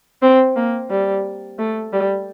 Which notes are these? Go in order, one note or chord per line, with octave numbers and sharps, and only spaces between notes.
C4
A#3
G3
A3
G3